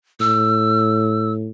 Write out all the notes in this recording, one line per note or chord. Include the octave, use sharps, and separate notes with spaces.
A2 E6